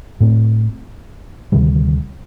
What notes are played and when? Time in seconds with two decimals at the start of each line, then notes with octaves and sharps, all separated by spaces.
0.21 A2 A3 C4
1.52 D2 C3 D#3 G3